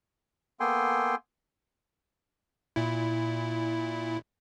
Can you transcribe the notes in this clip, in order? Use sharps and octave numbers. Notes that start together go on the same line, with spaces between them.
A#3 B3 A4 G5 G#5 C6
A#2 E4